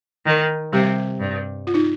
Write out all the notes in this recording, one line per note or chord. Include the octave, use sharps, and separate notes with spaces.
D#3
C3 G3 G4
G2
F4
D#4